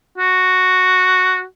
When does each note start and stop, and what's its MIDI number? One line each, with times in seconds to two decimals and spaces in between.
0.18 1.44 66